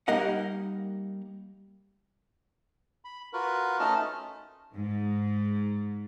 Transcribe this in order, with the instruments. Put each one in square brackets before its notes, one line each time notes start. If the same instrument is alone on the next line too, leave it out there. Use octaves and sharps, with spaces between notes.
[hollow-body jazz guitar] G3 A#3 D#4 A#4 D#5 F#5
[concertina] B5
F4 F#4 A#4 B4
A3 C#4 D#4 D#5 A5 F6
[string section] G#2